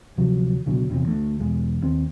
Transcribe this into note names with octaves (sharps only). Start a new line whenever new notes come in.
D2 C3 F3 F#3
C#2 B2 D3 F#3
A#1 E2 C3 F3
D2 A3
B1 E2 G#3
D#2 C4